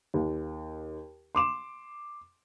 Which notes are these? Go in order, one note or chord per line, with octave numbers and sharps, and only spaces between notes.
D#2
C6 D6 E7